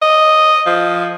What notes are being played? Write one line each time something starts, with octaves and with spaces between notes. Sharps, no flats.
D#5
F3